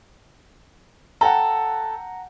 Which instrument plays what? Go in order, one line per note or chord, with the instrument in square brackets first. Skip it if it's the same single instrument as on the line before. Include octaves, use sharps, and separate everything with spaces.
[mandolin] A4 [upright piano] F#5 G5 A#5